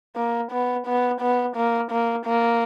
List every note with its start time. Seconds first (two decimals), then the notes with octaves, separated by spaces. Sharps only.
0.16 A#3
0.52 B3
0.86 B3
1.21 B3
1.56 A#3
1.91 A#3
2.26 A#3